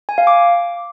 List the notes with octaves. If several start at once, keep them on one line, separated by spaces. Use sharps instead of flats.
G#5
F5
D6